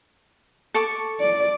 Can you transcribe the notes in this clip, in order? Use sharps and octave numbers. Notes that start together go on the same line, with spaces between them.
A4 C#6 D6
D5